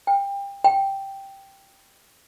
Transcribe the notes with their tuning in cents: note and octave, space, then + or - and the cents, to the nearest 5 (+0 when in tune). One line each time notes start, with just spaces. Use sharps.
G5 +25
G5 +0